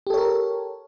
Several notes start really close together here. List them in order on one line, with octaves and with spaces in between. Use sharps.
G4 A4 C#5 A#4